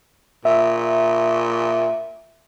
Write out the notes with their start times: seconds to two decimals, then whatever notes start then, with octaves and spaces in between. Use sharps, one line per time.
0.45 A#2 E5